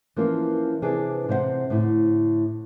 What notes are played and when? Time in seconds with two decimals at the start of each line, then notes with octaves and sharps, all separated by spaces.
0.16 E3 F3 A#3 C#4 F4 A#4
0.82 C3 E3 D4 G#4 B4 D5
1.29 C3 C4 C5 E5 F#5
1.70 A2 D3 E4